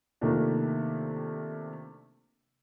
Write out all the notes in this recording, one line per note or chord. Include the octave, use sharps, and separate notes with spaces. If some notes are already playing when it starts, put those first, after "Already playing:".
C3 D#3 F3 A3 A#3 D4